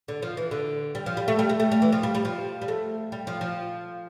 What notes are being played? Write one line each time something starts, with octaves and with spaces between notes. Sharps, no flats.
D3
F3
E3
D3
G3
F3
G3
A3
G3
A3
A3
G3
E3
F3
G3
G3
F3
G3
A3
G3
F3
F3